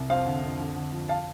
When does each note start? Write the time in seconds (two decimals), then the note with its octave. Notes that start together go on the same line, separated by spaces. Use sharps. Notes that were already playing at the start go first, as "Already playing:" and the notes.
Already playing: C2
0.10 F2 C5 F5
0.26 D3
0.43 F2
0.60 D3
0.76 D3
0.92 F3
1.08 F5 A5